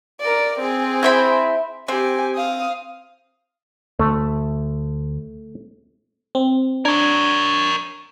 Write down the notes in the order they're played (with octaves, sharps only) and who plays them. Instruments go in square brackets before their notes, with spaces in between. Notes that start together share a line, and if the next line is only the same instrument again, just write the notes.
[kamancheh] A#4 D5
C4 G#4
[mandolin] E4 C5 B5
[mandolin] C4 [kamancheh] G4 G#5
[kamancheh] F5 D#6
[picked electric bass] D2 [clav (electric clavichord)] A3
[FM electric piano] C4
[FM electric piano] D4 G#6 [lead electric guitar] A#4 C#5